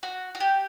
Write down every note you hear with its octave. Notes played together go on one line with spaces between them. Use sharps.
F#4
F#4
G4